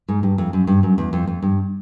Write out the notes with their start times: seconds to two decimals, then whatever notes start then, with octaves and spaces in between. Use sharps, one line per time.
0.08 G#2
0.23 G2
0.38 F2
0.53 F#2
0.67 G2
0.83 F#2
0.98 E2
1.13 F2
1.27 F2
1.42 G2